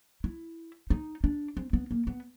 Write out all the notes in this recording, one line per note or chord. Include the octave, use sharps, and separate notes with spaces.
E4
D#4
D4
C4
B3
A#3
B3